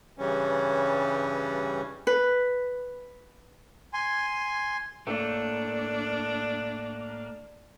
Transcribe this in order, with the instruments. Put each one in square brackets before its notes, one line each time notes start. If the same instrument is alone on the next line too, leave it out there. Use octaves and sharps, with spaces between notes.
[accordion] G2 C#3 E3 G3 C#4
[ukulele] B4
[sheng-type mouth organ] G#5 C6
[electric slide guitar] A2 A3 A#3 [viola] D4